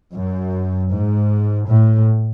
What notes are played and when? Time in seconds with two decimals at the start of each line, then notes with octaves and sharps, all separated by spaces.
0.15 F#2
0.91 G#2
1.68 A2